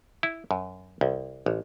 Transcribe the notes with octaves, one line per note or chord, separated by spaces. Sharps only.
E4
F#2
C2
A1